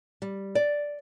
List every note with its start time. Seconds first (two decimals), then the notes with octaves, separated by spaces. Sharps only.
0.22 G3
0.55 D5